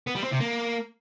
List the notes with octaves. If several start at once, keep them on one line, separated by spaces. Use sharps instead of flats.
B3
G3
C4
C3
A#3